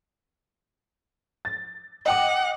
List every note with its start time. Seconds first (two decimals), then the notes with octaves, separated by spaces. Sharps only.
1.45 A6
2.06 D#5 F#5 G5 D6